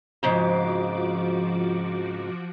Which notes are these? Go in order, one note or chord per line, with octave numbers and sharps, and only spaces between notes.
F2 G#2 C#3 F3 F#4 D6